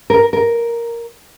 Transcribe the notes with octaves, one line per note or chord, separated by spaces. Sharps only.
A#4
A#4